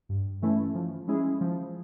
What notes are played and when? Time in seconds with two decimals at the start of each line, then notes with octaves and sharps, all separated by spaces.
0.09 G2
0.42 E3 A3 C#4 E4
0.75 F3
1.08 G#3 C#4 E4 G#4
1.41 F3